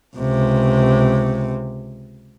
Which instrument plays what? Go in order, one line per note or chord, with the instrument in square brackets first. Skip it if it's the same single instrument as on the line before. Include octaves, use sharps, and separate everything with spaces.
[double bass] C#2 C3